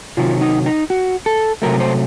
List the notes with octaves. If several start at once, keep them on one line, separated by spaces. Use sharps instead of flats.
C3 D#3 F#3 F4
D#4
D#4
F#4
A4
C3 F#3 A3 A#4
C5